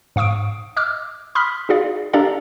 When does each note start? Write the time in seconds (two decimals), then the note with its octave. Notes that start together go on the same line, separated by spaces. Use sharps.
0.16 G#2 F5 C#6 D#6 D7
0.76 D#5 D6 E6 F6
1.35 B5 C6 D#6 F6 B6
1.69 D#4 F#4 G#4 D5 F5
2.13 D4 G4 A4 D5 F5 A#5